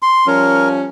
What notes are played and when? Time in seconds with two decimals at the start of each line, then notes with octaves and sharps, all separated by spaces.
0.02 C6
0.27 F3 G3 C#4 A#4